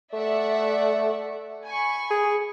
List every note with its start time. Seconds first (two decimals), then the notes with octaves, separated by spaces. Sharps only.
0.13 A3 D5 E5 F#5
1.65 G#5 B5 C#6
2.11 G#4